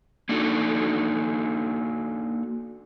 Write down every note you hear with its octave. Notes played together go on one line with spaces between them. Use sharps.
A#3 D4 D#4 F#4 A4